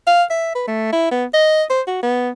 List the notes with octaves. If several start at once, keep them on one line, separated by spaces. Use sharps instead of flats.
F5
E5
B4
A3
E4
B3
D#5
C5
F#4
B3